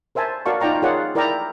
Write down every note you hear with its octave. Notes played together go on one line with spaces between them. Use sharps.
A#4 C5 E5 G#5 A5
F#4 A#4 D5 F5 A5 C#6
D#4 F4 D5 G5 A#5 C#6
F4 G#4 A#4 C#5 D5 F#5
E4 A#4 D5 E5 G5 A#5